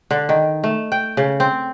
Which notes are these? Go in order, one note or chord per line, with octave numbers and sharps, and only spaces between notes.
D3
D#3
A3
G5
C#3
C4